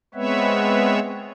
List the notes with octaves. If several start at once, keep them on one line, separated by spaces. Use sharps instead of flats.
G#3 B3 C4 B4 C#5 E5